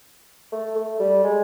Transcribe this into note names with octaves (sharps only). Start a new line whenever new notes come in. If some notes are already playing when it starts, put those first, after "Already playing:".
A3
A3
G3
G#3